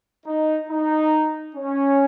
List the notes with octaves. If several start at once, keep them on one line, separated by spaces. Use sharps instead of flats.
D#4
D#4
C#4